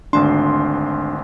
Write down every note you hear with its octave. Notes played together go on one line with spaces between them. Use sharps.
G#1 D2 D4 C6